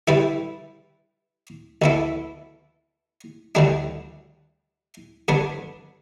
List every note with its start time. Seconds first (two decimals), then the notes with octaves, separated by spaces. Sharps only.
0.08 D3 G3 E4 B4
1.82 D2 D3 B3 E4 A4
3.55 D2 D3 G3 D4
5.28 G2 D3 B3 D4